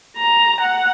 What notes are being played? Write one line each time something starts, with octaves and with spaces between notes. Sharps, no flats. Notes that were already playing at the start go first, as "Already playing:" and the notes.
A#5
F#5